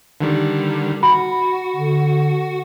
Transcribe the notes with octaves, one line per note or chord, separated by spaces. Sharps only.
D3 D#3 G3
F#4 B5
D3